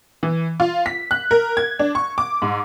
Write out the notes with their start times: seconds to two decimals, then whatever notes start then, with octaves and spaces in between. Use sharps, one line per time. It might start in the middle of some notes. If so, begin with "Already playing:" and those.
0.23 E3
0.60 F4
0.86 B6
1.11 F#6
1.31 A#4
1.57 G#6
1.79 D4
1.95 C#6
2.18 D6
2.42 G#2